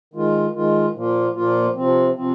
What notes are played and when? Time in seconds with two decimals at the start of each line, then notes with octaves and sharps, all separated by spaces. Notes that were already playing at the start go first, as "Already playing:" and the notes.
0.14 D#3 G#3 F4
0.54 D#3 G#3 F4
0.94 A#2 F3 A#3 F4
1.34 A#2 F3 A#3 F4
1.75 C3 F3 C4
2.15 C3 F3 C4